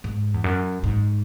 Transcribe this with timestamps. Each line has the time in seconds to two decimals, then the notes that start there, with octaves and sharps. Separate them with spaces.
0.04 G#2
0.34 E2
0.44 F#2
0.84 G#2